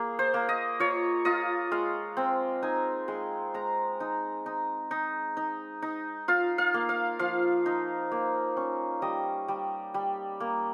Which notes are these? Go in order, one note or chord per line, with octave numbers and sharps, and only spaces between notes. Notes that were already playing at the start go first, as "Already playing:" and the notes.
Already playing: A#3 G#4
C5
A#3
D#5
F4 C#5
F4 D#5
G#3 F5
C4
D#4 G#5
G#3 C6
G#3 A#5
D#4
D#4
D#4
D#4
D#4
F4 F5
F5
A#3
F5
F3 F5
D#4
A#3
C#4
G3 D#5
G3
G3
A#3